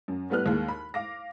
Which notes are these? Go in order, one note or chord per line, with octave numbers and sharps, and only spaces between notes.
F#2
A2 G3 B3 B4 F6 F#6
D#2 G#3 A#3
B5
F5 D6 A#6